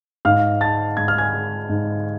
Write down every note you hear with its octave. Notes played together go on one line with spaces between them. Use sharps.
G#2 F5 F6
G#3 A5 A6
G#2 G#6
F6
G#5 G#6
G#3
G#2